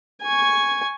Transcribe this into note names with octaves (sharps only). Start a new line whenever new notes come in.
G#5 C#6